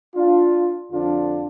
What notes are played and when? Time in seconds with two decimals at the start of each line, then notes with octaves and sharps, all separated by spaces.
0.15 D4 F4
0.92 F2 D3 F3 D4 F4